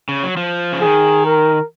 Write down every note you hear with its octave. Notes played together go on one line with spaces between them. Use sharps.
C#3
F#3
F3
C#3
D#3 G#4
A#4